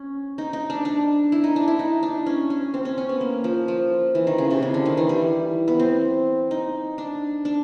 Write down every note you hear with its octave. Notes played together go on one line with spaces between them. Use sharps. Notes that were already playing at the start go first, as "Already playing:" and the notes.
Already playing: C#4
D#4
D#4
D4
D4
E4
D#4
D4
E4
D#4
D4
C#4
C#4
C4
C#4
C#4
B3
A#3
F3
F3
E3
D#3
C#3
C3
C#3
D3
D#3
E3
G3
B3
C4
D#4
D4
D4